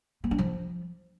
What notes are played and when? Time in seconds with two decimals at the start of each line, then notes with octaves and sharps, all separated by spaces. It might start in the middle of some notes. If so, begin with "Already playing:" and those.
0.24 A#3
0.31 D4
0.38 F3